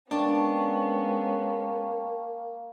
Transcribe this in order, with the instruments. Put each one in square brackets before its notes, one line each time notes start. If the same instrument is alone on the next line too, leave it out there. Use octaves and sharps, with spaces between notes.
[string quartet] G#3 B3 C#4 [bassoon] A#3 [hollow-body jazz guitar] D4 [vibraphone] G5 A5 C#6